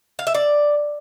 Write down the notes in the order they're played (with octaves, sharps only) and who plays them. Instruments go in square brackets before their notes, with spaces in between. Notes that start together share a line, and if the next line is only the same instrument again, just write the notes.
[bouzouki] F5
E5
D5